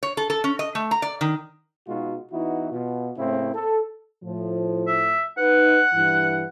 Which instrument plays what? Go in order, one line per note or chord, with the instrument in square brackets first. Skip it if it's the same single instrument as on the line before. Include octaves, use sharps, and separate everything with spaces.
[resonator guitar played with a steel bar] C#5
A4
A4
C#4
D#5
A3
A#5
D5
D#3
[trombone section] B2 G#3 D#4 F4 F#4
E3 B3 D#4 E4 F#4
B2 F4
A2 C#3 A#3 C4 E4
A4
[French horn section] A2 F3
[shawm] E5
[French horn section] D#4 B4 [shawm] F#5
[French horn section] G2 E3